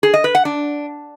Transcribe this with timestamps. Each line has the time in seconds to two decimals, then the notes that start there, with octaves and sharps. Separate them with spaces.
0.03 G#4
0.14 D#5
0.24 B4
0.35 F#5
0.45 D4